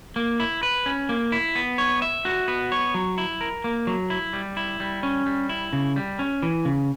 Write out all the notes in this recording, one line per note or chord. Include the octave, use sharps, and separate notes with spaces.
A#3
E4
B4
C#4
A#3
E4
B3
C#5
E5
F#4
B3
C#5
F#3
E4
A#4
A#3
F#3
E4
G3
E4
G3
C#4
G3
E4
C#3
G3
C#4
E3
C#3